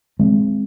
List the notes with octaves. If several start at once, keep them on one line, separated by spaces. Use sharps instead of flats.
G#3 C4